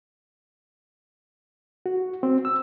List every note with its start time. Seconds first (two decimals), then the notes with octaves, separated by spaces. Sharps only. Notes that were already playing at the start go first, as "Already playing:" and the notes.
1.86 F#4
2.23 C4
2.45 E6